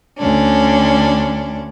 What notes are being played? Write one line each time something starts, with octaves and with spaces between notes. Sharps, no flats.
D2 C#4 D4